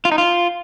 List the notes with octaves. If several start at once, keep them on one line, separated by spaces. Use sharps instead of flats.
F4
D#4
F4